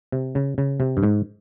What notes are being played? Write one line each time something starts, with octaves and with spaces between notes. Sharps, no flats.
C3
C#3
C#3
C3
G2
G#2